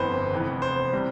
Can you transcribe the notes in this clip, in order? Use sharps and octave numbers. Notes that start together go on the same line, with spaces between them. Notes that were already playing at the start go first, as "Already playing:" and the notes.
Already playing: G1 F2 E3 B3 B4 C5
F1 F2 E3 B3
C5
C3 G3